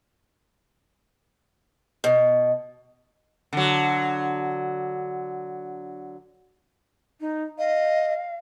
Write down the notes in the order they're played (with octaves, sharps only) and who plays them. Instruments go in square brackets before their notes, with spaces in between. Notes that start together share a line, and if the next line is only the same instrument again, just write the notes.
[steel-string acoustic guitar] B2
[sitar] D3 F#3
[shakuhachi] D#4
[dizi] D#5 [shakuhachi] F5